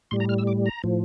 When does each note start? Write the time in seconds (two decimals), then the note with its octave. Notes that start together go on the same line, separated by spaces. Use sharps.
0.11 A2 G3 C6
0.20 A#5
0.29 F6
0.38 E6
0.47 D6
0.66 A#5
0.84 A2 F3